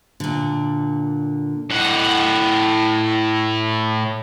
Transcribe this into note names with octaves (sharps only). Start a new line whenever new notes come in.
A#2 D3
A2 F#5